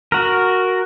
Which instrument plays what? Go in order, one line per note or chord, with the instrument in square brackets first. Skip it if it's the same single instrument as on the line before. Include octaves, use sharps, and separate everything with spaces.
[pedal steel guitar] F#4 A#4